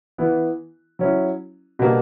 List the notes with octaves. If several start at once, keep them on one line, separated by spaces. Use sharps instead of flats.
E3 B3 E4
F#3 C#4 E4
B2 G3 A#3 D4